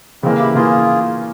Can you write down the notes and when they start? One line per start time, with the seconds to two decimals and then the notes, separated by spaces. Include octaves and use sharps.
0.23 C#3 E3 G#3 A#3 C4
0.39 E4 G4
0.55 C#3 E3 A#3 F4 G#4